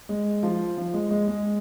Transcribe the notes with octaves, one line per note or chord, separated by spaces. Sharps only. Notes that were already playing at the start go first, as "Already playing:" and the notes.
G#3
F3
F3
G#3
G#3
G#3